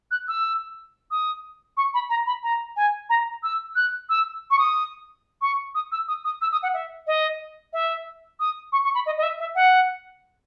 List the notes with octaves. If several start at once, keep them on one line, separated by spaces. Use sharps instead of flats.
F#6
E6
D#6
C#6
B5
A#5
B5
A#5
G#5
A#5
E6
F#6
E6
C#6
D#6
C#6
D#6
E6
D#6
D#6
E6
D#6
F#5
E5
D#5
E5
D#6
C#6
C#6
B5
D#5
D#5
E5
E5
F#5